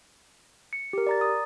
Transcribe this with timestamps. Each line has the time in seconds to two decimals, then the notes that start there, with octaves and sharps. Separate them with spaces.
0.73 C#7
0.93 G4 A#4
1.07 D5 A#5 A6
1.21 D#6